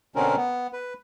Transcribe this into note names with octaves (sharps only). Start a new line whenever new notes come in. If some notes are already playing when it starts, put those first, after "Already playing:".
B2 D3 C4 C#4 A#4
B3
B4